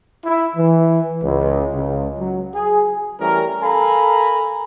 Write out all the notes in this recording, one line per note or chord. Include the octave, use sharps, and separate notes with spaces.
E4
E3
C#2
C#2
F#3
G#4
E3 G3 A3 C#4 A#4
A4 A#4 F5 G#5 A#5 B5